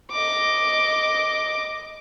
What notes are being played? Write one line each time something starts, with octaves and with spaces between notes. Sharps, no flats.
D#5 D6